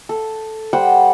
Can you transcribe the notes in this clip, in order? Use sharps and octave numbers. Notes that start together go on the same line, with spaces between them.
A4
G3 C5 F#5 G5